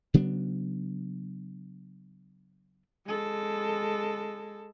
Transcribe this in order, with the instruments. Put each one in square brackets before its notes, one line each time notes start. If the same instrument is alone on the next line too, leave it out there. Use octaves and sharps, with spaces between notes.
[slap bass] C#3 F#3 B3 D4
[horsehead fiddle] G#3 A4